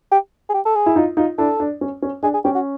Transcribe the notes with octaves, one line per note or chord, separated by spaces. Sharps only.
G4
G#4
G4
A4
G#4
E4
D#4 F4
D#4 F4
D4 E4 A4
D4
C#4
C#4
D4 G#4
G#4
C#4 G4
F#4